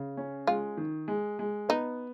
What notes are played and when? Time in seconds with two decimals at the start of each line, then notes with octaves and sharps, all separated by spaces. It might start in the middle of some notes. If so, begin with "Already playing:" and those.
Already playing: C#3
0.17 C#4
0.47 G#3 F4
0.77 D#3
1.08 G#3
1.39 G#3
1.69 B3 D#4